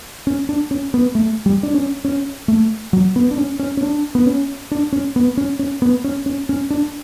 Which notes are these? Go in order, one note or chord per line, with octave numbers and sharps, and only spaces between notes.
C#4
D4
C#4
B3
A3
G3
D4
C#4
C#4
A3
F#3
B3
D4
C#4
C#4
C#4
D4
B3
C#4
D4
C#4
B3
C#4
C#4
B3
C#4
C#4
C#4
D4